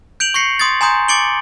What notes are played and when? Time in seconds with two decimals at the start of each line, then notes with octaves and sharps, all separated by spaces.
0.20 G6 D7 F7 F#7
0.34 C#6 G6 A#6 C7 C#7
0.59 C6 D#6 G#6 A6
0.81 G#5 A#5 C6 D#6 G6
1.08 D6 A6 C#7 D7 F#7 G7